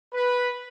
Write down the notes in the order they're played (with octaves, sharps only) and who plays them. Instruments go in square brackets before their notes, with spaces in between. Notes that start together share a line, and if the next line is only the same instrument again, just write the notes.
[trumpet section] B4